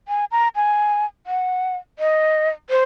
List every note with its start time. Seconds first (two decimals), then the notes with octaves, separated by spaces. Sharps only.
0.08 G#5
0.32 A#5
0.56 G#5
1.27 F#5
1.99 D#5
2.70 C5